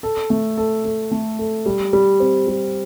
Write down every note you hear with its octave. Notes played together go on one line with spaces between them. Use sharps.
A4
A3
A4
A4
A3
A4
G3
G3
C4
G3